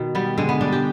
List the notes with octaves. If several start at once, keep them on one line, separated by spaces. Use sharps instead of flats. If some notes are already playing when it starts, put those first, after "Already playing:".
Already playing: B2 D#3
G3 B3
D3 G#3
B3
G3 D4
G4